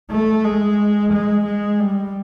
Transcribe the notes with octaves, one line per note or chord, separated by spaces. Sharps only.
A3
G#3
G#3
G#3
G3